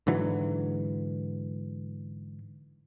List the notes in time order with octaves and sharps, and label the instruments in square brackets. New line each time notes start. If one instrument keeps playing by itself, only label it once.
[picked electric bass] G#2 D3 E3 F#3